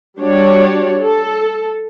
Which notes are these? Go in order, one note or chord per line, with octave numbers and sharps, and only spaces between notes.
G3 D4 F#4 C#5 D5
A4